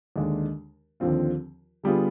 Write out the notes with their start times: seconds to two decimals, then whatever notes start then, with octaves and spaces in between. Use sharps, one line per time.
0.16 D#2 D3 G#3 D4
1.00 D#2 D3 F3 C4 F4
1.83 D3 G3 B3 F4 G#4